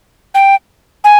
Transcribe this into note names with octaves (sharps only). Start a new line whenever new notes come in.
G5
G#5